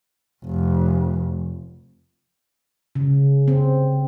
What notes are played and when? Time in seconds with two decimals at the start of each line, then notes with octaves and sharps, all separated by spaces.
0.45 F1
2.95 C#3
3.48 C4